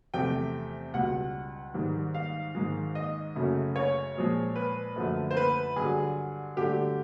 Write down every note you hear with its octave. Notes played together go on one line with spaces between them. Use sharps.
E2 C3 F3 A3 G5
C#2 B2 G3 F#5
G#2 D#3 G3
F5
G#2 D#3 G#3
D#5
F#2 C#3 F#3 A3
C#5
A#2 F3 G#3
B4
F#2 D3 F3 A3
C5
B4
G2 D3 F#3 G#4
G2 D3 F#3 A3 G4